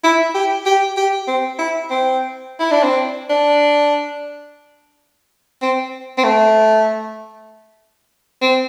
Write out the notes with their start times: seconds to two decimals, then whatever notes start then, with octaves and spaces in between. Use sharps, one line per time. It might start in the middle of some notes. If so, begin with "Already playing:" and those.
0.04 E4
0.35 G4
0.66 G4
0.97 G4
1.27 C4
1.59 E4
1.90 C4
2.60 E4
2.71 D4
2.83 C4
3.29 D4
5.62 C4
6.18 C4
6.24 A3
8.41 C4